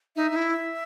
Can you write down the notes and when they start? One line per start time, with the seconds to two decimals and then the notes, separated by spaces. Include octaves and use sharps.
0.16 D#4 E5
0.31 D#4
0.36 E4